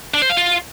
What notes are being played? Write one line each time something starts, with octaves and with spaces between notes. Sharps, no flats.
D4
C5
F5
F4